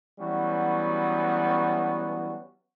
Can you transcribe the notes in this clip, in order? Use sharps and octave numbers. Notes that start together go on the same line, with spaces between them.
E3 F#3 G3 B3 C#4 F#4